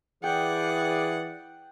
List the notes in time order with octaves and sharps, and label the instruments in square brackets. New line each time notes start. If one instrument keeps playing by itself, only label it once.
[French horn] E3 [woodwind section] G#4 D5 [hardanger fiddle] F#5 [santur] G5